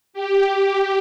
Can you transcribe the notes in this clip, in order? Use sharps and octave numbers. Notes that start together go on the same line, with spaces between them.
G4